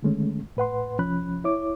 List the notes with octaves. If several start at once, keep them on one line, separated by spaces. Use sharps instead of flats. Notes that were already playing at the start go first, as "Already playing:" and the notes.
D3 D#3 G#3 A3 C#4
A2 B4 F#5 C6
C2 F3 C#4 B5 F#6
E4 C#5 D6